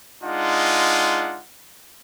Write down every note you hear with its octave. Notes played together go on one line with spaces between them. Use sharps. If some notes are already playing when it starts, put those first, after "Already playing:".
G#3 D4 D#4 F4 F#5